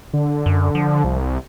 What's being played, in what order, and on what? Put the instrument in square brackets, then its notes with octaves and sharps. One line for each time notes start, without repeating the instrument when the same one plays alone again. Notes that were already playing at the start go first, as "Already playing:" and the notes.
[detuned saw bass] D3
[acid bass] F#2
F3
[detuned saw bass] C2